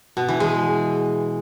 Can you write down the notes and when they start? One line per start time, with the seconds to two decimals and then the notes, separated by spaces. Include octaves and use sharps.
0.17 B2
0.29 E3
0.40 G#3